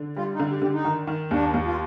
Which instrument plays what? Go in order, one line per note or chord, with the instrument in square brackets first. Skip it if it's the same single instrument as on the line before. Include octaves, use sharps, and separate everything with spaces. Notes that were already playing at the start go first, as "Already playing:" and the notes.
Already playing: [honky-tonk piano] D3
[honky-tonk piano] G3 [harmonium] F4
[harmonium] D#4
[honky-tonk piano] D3 [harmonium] F4
[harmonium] G4
[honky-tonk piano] D3 [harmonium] G4
[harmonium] D#4
[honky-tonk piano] D#3
D#3
[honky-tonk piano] D#2 [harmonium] D4
[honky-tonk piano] D#2
[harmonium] F4